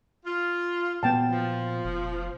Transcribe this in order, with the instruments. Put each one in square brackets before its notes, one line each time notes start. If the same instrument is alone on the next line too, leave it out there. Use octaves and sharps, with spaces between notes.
[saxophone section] F4
[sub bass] A#2 [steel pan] B3 G5 A5
[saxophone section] F3
[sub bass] F1